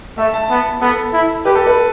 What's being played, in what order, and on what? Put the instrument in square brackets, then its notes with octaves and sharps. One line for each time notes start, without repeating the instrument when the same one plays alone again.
[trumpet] A3 [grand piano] E5
[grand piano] A5
[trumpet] B3 [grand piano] A5
[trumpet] B3 [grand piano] A4
[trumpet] E4
[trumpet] G4 [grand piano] B4
[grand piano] A4
B4